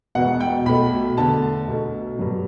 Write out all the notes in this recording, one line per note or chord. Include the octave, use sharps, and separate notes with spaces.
E1 E2 B2 F#5
G5
B1 B2 A3 B5
E2 D3 A3 A5
B1 B2 A3
G2 F#3